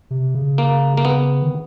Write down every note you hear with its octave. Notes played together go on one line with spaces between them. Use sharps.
C3
C#3
A#3
A#3
B3
D#3